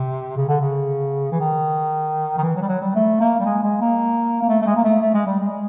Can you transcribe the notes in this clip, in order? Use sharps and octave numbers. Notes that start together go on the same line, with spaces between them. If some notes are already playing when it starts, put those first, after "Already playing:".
Already playing: C3
C#3
D3
C#3
E3
D#3
D#3
E3
F#3
G3
F#3
G3
A3
A#3
G3
G#3
G#3
A#3
A#3
A3
A3
G#3
A#3
A3
A3
G#3
G3
G#3